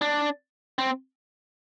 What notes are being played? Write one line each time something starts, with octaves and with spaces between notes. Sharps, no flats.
D4
C4